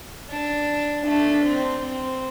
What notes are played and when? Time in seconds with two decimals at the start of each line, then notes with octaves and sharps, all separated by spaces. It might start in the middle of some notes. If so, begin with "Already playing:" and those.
0.29 D4
1.05 A3 D4
1.43 C4
1.82 C4